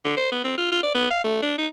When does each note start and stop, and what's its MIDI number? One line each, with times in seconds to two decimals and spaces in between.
0.05 0.15 50
0.17 0.31 72
0.32 0.41 59
0.44 0.57 60
0.58 0.71 65
0.72 0.82 65
0.83 0.94 74
0.95 1.07 59
1.10 1.22 77
1.24 1.41 57
1.42 1.56 62
1.58 1.67 63